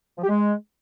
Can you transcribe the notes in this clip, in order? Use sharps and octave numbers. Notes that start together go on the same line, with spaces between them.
F3
G4
G#3